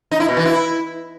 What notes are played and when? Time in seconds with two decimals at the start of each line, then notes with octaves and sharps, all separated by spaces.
0.11 D#4
0.20 E4
0.28 B2
0.37 E3
0.45 E4